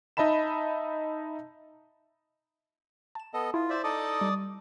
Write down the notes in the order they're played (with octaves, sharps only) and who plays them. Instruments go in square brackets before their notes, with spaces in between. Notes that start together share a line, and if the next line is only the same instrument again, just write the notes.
[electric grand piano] D#4 D#5 E5 A5 B5 E7
[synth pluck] A5 E7
[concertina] B3 A4 D#5
[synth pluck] E4 [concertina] F4
[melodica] C5 D5 E5
[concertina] D#4 A4 D#5 [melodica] D5 D6 D#6
[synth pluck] G3